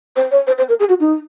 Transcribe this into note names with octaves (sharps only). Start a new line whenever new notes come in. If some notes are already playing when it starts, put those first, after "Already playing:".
C5
C#5
C5
C5
A#4
G#4
F#4
D#4